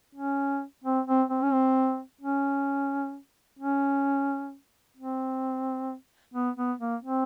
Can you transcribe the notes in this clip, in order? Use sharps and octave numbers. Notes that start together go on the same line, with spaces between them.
C#4
C4
C4
C4
C#4
C4
C#4
C#4
C4
B3
B3
A#3
C4